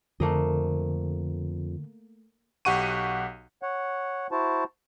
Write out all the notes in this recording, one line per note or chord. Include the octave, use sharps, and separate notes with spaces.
F2 D3 A3 A#3 D#5
B1 G4 F#5 C#6 D#7
C#5 F#5
E4 F#4 C5 A5